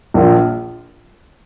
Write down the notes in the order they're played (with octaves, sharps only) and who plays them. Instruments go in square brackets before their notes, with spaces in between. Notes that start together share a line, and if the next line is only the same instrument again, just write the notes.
[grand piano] A#1 A#2 F3